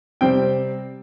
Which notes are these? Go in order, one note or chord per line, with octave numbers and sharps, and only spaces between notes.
C3 G3 C4 G5